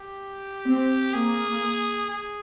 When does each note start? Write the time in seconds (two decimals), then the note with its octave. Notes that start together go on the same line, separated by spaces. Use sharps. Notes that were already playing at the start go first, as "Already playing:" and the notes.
Already playing: G4
0.65 C4
1.13 A#3 G#4
2.10 G#4